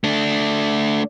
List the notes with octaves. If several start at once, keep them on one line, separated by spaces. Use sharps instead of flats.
A3 D4